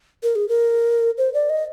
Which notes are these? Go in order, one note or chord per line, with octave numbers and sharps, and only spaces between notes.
A#4
G#4
A#4
C5
D5
D#5